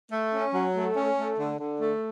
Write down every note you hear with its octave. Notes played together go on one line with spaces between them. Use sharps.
A3
C#4
F#3
A3
C#4
A3
D3
D3
A3